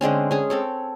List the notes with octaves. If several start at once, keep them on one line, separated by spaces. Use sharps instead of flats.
D3 G#3 C4 C#4
C#4 G#4
C4 A4 C#5